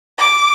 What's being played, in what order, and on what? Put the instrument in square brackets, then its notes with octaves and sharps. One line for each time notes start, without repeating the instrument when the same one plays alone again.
[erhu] D6